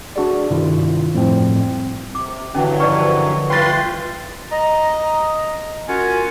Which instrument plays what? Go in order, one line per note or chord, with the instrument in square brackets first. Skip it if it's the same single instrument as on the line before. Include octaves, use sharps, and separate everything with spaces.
[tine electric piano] D4 F#4 G#4 D5
G2 C3 D#3 E4 F4
F2 A2 F3 G3 C4
[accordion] C3 [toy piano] D6
[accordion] G2 E3 F#3 [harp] D3 [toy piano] C#4 D#4 G5
[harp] F3 D4 [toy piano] B4 D5 D#5 [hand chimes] C#6
[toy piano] A#4 C5 A5
[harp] G3 E4 [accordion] F4 B4 C6 [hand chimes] G5 A6
[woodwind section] D#5 A#5
C#4 F4 F#4 A#4 F#5 G#5